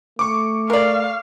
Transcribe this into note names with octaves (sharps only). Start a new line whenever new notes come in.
A3 C#6 D6
A#4 D5 F5